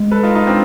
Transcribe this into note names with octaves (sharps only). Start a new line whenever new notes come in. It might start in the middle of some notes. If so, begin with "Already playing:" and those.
Already playing: G#3
A4 B4
D#4 F4
D#4 F4
C4 D4